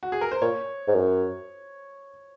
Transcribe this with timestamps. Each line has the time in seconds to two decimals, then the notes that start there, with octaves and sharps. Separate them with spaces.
0.03 F#4
0.12 G#4
0.21 A#4
0.31 C5
0.41 A#2 C#5
0.87 G#2
0.95 F#2